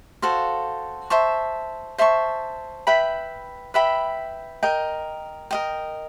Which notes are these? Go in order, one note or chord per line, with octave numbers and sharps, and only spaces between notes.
F#4 A4 C5 F5
C5 E5 A5 C#6
C5 E5 A5 C#6
B4 E5 G5 B5
B4 E5 G5 B5
A#4 D#5 G5
A#4 D#5 G5